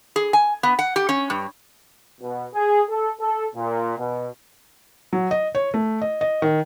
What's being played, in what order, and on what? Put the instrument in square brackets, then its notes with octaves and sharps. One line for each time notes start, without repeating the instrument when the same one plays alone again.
[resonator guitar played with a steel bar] G#4
G#5
B3
F#5
G4
C#4
G2
[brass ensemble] B2
G#4
A4
A4
A#2
B2
[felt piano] F#3
D#5
C#5
A3
D#5
D#5
D#3